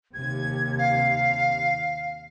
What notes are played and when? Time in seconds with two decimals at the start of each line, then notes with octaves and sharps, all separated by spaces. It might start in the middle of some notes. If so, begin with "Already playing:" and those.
0.14 D#2 C3 G#6
0.78 F5